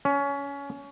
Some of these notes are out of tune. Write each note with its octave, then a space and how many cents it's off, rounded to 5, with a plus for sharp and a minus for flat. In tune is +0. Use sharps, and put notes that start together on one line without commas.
C#4 +20